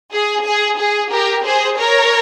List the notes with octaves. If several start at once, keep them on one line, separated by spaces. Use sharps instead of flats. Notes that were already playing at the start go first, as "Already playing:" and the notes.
G#4
G#4
G#4
G4 A#4
G#4 C5
A#4 C#5